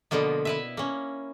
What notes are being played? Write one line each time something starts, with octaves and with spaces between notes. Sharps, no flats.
B2 D3 F3 A#3 B3
E4 B4 E5
A#3 C#4